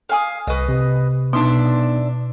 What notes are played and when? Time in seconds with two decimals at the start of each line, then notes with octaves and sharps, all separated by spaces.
0.09 F5 G#5 D#6
0.47 C2 B4 D#5 C#6
0.69 C3
1.33 B2 B3 D4 D#4 E5 C6